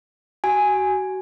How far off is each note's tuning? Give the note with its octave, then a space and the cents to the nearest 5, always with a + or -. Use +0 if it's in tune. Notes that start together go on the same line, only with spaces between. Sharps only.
F#4 +30 G#5 +0